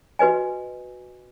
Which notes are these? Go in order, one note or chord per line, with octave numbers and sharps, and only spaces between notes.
F#4 B4 D#5 G#5